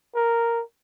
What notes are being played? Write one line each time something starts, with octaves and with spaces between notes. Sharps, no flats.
A#4